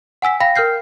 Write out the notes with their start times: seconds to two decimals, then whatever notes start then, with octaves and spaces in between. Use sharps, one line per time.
0.22 F#5 G#5 E6 B6
0.40 F5 G5 B5 A#6
0.56 A#4 G5 F6 G6 C7